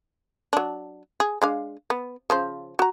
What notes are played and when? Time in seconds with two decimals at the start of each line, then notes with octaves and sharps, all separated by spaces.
0.53 F#3 D4
1.20 G#4
1.42 G#3 D4 F5
1.90 B3
2.30 C#3 F3 C5
2.79 F#4 A#5